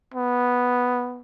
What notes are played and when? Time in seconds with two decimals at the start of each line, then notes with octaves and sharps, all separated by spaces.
0.14 B3